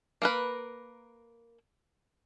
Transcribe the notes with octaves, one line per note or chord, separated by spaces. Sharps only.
A#3 A#4 B4